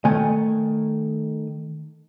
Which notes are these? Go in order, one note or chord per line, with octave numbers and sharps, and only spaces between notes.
D#3 A3 G#5